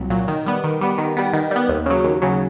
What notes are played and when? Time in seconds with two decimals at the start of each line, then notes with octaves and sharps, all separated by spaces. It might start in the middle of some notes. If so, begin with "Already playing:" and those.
Already playing: C2 A#2 F#3
0.10 A#2 F#3
0.28 D#3
0.46 G3 B3
0.64 D#3
0.81 G3 B3
0.98 D#3
1.17 G3 B3
1.33 D#3
1.51 G3 B3
1.69 D#2
1.86 C#3 F#3
2.04 D#2
2.22 C#3 F#3